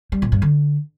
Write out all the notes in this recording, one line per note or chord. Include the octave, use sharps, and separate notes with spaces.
G3
A#2
G2
D3